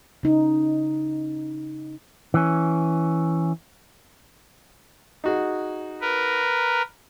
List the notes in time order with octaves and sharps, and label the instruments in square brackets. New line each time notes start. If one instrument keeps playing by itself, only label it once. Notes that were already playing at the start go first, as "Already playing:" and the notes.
[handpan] C#3 D#4
[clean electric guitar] E3 C#4
[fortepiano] D#4 F#4 G#4
[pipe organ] A#4 B4